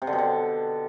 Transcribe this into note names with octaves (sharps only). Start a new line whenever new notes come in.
C3
D3
B2
D3